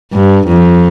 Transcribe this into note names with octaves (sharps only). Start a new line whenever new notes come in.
G2
F2